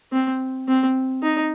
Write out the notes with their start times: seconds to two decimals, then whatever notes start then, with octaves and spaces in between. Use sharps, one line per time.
0.12 C4
0.68 C4
1.23 D#4